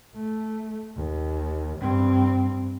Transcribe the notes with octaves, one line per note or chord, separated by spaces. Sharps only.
A3
D#2
G2 C4